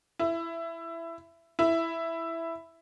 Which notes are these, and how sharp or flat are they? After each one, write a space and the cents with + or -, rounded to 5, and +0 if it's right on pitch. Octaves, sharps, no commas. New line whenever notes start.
E4 +15
E4 +5